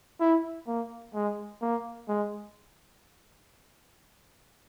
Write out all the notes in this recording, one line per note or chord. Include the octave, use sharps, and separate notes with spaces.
E4
A#3
G#3
A#3
G#3